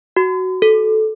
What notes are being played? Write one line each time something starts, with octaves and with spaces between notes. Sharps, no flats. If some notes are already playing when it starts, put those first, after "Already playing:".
F#4
A4